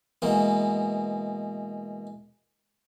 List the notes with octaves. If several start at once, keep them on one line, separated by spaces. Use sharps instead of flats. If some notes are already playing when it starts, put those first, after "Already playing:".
B2 E3 G#3 A#3